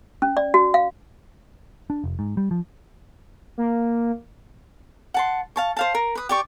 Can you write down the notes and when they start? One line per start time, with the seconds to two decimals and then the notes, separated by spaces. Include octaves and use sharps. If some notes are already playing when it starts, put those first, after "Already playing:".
0.22 C#4
0.37 D5
0.54 F#4
0.74 F5
1.90 D4
2.04 F1
2.19 G#2
2.37 G3
2.51 F3
3.58 A#3
5.14 F#5 A5 C6
5.56 F5 A5 C#6
5.77 C5 F5 A5
5.95 A#4
6.15 B4 D#6
6.29 G4 D5 C#6